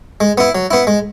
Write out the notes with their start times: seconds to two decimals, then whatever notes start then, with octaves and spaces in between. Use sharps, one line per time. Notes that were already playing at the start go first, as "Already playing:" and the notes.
0.21 G#3
0.38 B3 E4
0.55 F#3
0.71 B3 E4
0.87 G#3